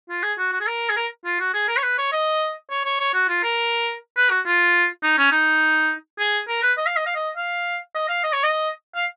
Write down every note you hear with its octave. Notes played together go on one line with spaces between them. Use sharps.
F4
G#4
F#4
F#4
G#4
A#4
G#4
A#4
F4
F#4
G#4
A#4
C#5
B4
C#5
D#5
C#5
C#5
C#5
F#4
F4
A#4
B4
F#4
F4
D#4
C#4
D#4
G#4
A#4
B4
D#5
F5
D#5
F5
D#5
F5
D#5
F5
D#5
C#5
D#5
F5